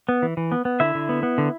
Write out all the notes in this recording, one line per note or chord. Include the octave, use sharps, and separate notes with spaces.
B3
E3
E3
B3
B3
D3 E4 E5
D3
B3
B3
D3